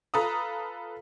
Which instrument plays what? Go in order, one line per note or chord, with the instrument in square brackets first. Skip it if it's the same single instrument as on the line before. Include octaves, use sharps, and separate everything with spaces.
[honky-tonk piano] F4 A4 B4 A#5 D#6